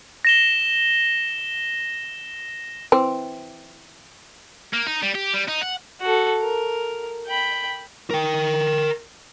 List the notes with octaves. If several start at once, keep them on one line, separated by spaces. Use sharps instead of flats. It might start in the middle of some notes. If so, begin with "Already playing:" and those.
A#6 E7 G7
E3 C4
A#3
D#4
G3
G4
G3
D#4
F#5
F#4 A4
A#4
G5 B5
A#4 G5